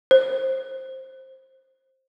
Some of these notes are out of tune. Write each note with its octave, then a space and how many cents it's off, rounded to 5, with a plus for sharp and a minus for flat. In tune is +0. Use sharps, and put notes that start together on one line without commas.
C5 +15